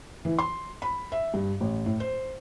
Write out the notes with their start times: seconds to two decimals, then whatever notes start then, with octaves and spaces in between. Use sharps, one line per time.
0.25 E3
0.39 C6
0.82 B5
1.12 E5
1.34 G2
1.61 A1
1.86 A2
2.00 C5